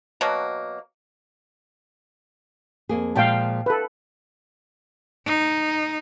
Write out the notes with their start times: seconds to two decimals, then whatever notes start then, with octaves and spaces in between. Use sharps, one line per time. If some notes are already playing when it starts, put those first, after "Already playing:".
0.21 B2 F#3 A#3
2.89 F2 A#3 G#4
3.15 A#2 F3 G#3 F5 G5 A5
3.66 A4 B4
5.26 D#4